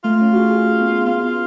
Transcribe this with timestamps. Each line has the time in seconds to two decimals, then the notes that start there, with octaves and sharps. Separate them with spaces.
0.04 A3 F4
0.21 C#4
0.33 F#4
0.38 G#4
0.51 G#4
0.56 F#4
0.80 B3
1.05 B3 F4
1.23 B3